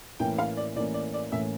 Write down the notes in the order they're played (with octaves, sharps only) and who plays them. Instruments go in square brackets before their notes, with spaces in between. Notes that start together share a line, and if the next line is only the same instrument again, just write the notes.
[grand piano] A2 E3 A#3 C#4 [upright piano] G5
[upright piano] F5
D5
[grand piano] A2 E3 A#3 C#4 [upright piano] D5
[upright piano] D5
D5
[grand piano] A2 E3 A#3 C#4 [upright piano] E5